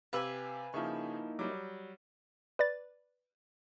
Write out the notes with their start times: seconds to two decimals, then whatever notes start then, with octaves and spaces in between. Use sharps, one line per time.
0.13 C3 G4 B4 F5 G#5 E6
0.74 C#3 F3 A#3 D#4 E4 G#4 E5 C#6
1.39 F#3 G3 D6
2.59 B4 D5 A6